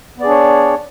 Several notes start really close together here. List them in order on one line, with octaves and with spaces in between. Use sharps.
B3 D5 G#4 D4 C#5